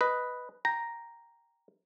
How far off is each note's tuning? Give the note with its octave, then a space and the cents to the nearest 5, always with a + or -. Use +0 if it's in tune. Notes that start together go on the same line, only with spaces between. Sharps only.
B4 +0 D#5 +0
G5 +0 A#5 +0